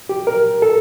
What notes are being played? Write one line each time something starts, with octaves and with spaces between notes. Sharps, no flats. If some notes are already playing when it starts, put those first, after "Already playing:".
G4
A#4
A4